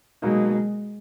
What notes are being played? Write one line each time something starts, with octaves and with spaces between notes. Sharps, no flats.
B2 F#3 G#3 A#3 D#4